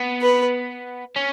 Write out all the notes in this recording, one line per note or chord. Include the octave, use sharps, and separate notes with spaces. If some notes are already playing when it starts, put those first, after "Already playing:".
Already playing: B3
B4
C#4